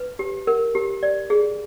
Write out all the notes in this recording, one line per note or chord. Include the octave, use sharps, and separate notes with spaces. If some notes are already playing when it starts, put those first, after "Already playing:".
Already playing: B4
G4
A#4
G4
D5
G#4